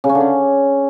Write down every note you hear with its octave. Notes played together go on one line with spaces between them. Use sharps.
C#3
C#4
D3
C#4